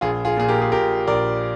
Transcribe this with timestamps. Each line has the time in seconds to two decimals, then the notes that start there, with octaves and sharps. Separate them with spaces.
0.01 A#1 F4 G#4
0.25 F4 G#4
0.37 A#2 G#4
0.49 G4 A#4
0.61 G#4
0.72 A#2 G4 A#4
1.07 A#1 A#4 D5